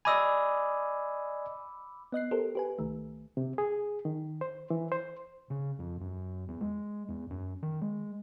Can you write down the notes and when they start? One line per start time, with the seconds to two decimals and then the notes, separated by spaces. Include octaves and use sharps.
0.05 D5 D#5 G#5 B5 D6 E6
2.12 B3 D#5 F#6 C7
2.31 G4 A4 A#4 C5
2.55 G4 B4 G#5
2.79 C2 D#3 A3
3.37 C3
3.58 G#4
4.05 D#3
4.41 C5
4.70 E3
4.92 C5
5.50 C#3
5.79 F2
6.00 F#2
6.48 E2
6.61 G#3
7.09 E2
7.30 F#2
7.63 D#3
7.81 G#3